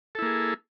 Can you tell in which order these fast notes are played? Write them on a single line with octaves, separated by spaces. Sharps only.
A4 E4 A#3 G#4